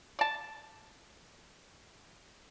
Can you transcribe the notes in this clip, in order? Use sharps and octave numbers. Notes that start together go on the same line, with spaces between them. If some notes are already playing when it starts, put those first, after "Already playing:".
D5 A5